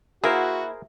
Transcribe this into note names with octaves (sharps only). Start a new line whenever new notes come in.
A#3 E4 F#4 G#4 A#4 C5